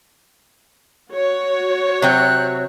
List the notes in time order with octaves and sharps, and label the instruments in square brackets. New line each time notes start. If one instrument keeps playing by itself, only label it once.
[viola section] F#4 C#5
[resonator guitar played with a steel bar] C3 F#3 C4 [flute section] F#6 G6